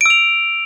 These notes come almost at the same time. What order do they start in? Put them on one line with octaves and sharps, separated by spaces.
D7 E6 F7